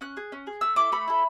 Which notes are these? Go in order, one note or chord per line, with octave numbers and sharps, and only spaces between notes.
C#4 F#6
G#4
C#4
G#4
A3 E6
E4 A4 D6
A3 B5
E4 A4